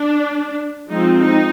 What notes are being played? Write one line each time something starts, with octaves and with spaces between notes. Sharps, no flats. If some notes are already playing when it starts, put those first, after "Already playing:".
Already playing: D4
F3 G#3 C4 D#4
D#4